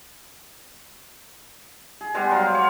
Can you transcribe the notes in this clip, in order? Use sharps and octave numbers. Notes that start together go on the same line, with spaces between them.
G#4
G3 G#3 B3
F#3 G#3 C5 F5
C#5 F#5